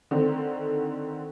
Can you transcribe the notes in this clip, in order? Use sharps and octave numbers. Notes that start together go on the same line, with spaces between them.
D3 D#3 C4